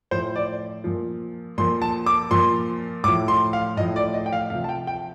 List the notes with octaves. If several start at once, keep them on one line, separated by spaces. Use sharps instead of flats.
A2 F3 C5
D5
A#2 F3
A#2 F3 C6
A5
D6
A#2 F3 C6
A2 F3 D6
C6
F5
A2 F3 D#5
D5
D#5
G5
F5
C3 F3 F5
A5
G5
G5